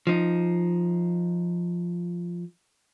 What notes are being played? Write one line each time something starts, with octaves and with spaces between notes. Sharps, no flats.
F3 D#4